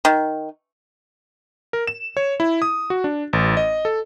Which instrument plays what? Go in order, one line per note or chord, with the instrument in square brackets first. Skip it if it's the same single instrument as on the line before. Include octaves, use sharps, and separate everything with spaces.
[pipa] D#3
[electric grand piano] A#4
E7
C#5
E4
D#6
F#4
D4
A1
D#5
A4